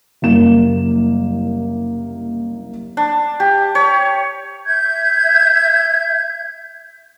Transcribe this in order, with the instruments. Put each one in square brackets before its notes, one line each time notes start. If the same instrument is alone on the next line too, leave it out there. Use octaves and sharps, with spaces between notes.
[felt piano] F#1 C2 A#3 E7
[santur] D4
G4
C#5
[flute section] E5 G6 G#6